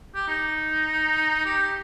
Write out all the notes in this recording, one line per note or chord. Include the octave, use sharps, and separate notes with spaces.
G4
D#4
G4